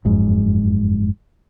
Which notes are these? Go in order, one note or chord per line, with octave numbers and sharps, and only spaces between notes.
F#1 F2 G#2